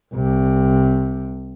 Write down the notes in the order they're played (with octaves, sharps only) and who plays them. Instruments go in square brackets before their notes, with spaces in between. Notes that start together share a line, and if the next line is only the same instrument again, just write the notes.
[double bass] C2 C3